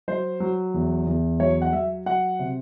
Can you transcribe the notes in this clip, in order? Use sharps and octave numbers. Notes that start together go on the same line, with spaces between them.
F#3 C5
F#3
E2
E2
F#3 C#5
F#5
F#3 E5
F#3 F#5
C3